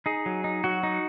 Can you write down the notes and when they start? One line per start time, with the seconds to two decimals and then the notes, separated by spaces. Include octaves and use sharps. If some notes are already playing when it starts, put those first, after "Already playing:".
0.06 D#4 G#4
0.26 F#3
0.44 D#4
0.64 F#3 F#4
0.83 D#4